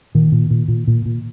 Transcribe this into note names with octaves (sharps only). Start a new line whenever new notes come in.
A#2 D#3
A#2
A#2
A#2
A#2
A#2